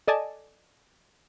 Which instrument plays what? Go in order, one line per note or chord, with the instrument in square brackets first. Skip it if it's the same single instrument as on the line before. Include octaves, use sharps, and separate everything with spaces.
[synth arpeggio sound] A4 D5 D#5 G#5 A5